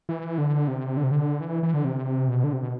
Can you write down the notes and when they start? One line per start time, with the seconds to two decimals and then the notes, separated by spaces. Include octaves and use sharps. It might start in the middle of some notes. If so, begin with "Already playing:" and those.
0.09 E3
0.38 D3
0.68 C3
0.97 D3
1.04 C3
1.11 D3
1.40 E3
1.63 E3
1.74 D3
1.85 C3
2.28 B2
2.44 D3
2.53 C3
2.63 B2